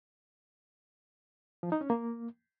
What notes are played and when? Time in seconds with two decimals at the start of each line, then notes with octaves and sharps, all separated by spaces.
1.63 F3
1.72 D#4
1.81 C#4
1.90 A#3